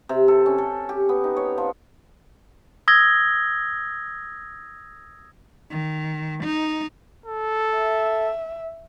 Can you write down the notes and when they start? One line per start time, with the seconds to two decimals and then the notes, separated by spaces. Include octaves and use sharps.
0.09 C3
0.28 A4
0.46 C#4
0.58 A4
0.89 G4
1.09 B3
1.24 D#4
1.37 C#5
1.58 F3
2.88 D#6 E6 G#6 A#6 G7
5.71 D#3
6.44 D#4
7.26 A4
7.77 E5